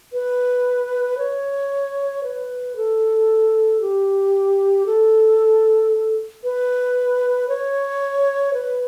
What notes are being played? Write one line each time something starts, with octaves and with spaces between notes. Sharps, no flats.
B4
C#5
B4
A4
G4
A4
B4
C#5
B4